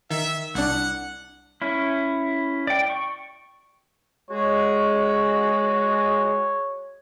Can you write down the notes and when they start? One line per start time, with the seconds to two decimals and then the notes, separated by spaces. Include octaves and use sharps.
0.10 D#3 E5
0.55 C2 D4 F#5
1.62 C#4 E4
2.67 D5 G5
2.90 C#6
4.31 G#3 F#4 C#5